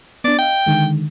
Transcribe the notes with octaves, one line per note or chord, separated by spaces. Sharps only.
B3 D4 D5
D#5 F5 G5
D3 D#3 G#3